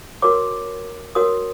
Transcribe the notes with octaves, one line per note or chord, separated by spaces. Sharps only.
F#4 A#4 C#5 D6
F#4 A#4 C#5 D#6